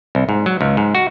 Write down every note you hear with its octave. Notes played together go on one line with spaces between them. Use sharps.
C2
G#2
F#3
C#2
G#2
F#4